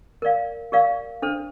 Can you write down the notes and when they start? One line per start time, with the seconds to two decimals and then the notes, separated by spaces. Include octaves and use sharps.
0.22 A#4 D5 F5
0.72 G4 A#4 D5 F5
1.22 D4 A4 C5